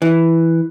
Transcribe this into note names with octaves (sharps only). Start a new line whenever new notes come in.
E3